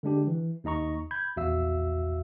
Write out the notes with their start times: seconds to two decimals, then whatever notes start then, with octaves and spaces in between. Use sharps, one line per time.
0.03 D3 G#3 D4 G4
0.27 E3
0.64 D#2 D#4 D#5 A#5 C#6
1.11 B5 G6 G#6
1.36 A#1 E2 F#4 E5 F5 E6